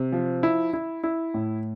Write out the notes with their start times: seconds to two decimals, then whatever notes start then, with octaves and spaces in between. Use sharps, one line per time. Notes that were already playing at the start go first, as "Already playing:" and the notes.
Already playing: C3
0.12 F3
0.43 E4
0.73 E4
1.03 E4
1.34 A2